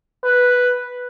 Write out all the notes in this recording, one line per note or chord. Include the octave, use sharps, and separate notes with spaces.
B4